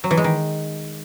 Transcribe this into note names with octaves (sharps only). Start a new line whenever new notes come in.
F#3
E3
G#3
D#3